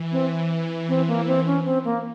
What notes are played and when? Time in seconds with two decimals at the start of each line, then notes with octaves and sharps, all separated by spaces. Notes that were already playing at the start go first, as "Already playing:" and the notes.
Already playing: E3
0.12 C4
0.88 C4
1.08 A#3
1.27 C4
1.46 C#4
1.65 C4
1.84 A#3